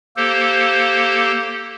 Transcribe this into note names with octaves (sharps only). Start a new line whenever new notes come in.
A#3 G4 A4 C5